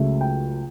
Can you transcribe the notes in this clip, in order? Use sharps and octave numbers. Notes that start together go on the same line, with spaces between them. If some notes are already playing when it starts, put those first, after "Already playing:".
Already playing: C#2 C#3 F#3 A3 E5
G5